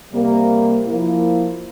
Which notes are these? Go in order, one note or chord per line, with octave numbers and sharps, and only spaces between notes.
C3 G3 A#3
F3 A#3 E4